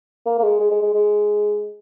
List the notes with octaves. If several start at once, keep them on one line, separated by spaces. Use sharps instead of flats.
A#3
A#3
G#3
G#3
G#3
G#3
G#3